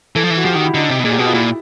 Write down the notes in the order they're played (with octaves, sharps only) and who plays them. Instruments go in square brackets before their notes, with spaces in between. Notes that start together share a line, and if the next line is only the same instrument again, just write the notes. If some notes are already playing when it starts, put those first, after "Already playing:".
[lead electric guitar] E3 [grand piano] A4
[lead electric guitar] F3
E3
[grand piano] F#4
[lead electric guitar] F3 [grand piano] G4
[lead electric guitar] D#3 [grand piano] F#4
[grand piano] E4
[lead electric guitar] D3 [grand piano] D#4
[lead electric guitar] C3
B2
[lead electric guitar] A#2 [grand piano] G#4
[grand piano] G4
[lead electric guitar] B2 [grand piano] F#4
[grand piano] F4
[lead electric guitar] A#2 [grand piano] E4